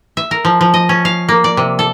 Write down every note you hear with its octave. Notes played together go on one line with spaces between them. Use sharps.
E5
A#4
F3
F3
D#5
C#4
F5
A#3
D5
C3
A4